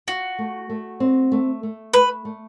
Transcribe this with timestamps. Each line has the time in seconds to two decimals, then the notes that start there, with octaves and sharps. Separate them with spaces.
0.07 F4 F#4
0.39 A3
0.70 A3
1.00 C4
1.32 A3
1.63 A3
1.93 A3 B4
2.25 A3